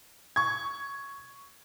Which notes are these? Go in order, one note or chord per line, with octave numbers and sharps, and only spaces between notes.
C#6 G#6